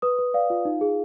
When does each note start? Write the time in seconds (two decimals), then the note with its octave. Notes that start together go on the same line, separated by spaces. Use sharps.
0.02 B4 D#6
0.19 B4
0.34 D5 F5
0.50 F4
0.65 D#4
0.81 G#4